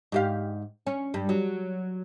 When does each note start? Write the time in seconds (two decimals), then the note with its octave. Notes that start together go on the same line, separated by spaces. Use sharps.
0.12 G#2 G4 F5
0.87 C#4
1.14 G2
1.29 F#3